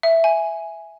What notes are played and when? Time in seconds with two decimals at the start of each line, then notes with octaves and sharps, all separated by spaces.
0.03 E5
0.24 G#5